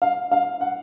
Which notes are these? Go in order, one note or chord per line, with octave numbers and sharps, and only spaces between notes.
F5
F5
F#5